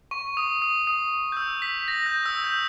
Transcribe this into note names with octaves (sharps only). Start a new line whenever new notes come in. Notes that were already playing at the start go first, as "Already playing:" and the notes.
C#6
D#6
D#6
D#6
G6
E6
B6
A#6
G6
E6
G6